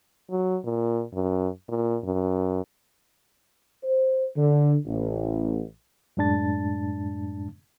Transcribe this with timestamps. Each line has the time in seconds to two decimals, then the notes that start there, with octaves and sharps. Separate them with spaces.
0.30 F#3
0.64 A#2
1.13 F#2
1.68 A#2
2.04 F#2
3.84 C5
4.36 D3
4.86 A1
6.17 F#2 A2 G#3 D4 A5 A6